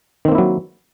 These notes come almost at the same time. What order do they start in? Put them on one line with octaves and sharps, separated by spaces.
D#3 C4 A#3 E4 F#3